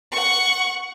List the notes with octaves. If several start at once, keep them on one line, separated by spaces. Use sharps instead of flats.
F#5 C#6